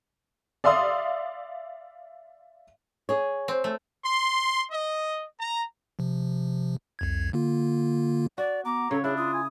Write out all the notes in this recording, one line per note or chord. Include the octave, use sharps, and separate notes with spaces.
D5 E5 F5 C6 D#6
G#4 C#5
C4
A3
C6
D#5
A#5
C3 F3
C2 F2 G#6
D3 A#3 F4
F#4 D5
B3 A#5 D6
C#3 A4 C#5
D4 E4 G#4 C#5
F4 D#6
G#5